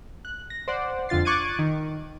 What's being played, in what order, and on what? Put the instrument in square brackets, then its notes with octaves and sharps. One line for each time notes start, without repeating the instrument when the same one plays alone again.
[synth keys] F#6
A#6
C5 D5 F#5
F2 D3 F4 A6 C7
C#6 D6 F#6 G#6 A6 D#7
D#3